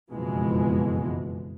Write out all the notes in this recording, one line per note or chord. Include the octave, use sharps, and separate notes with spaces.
F#1 F2 B2 E3 G#3